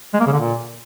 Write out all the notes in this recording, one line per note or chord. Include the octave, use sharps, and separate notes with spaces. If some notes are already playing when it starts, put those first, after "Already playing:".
G#3
A#3
C#3
D3
A#2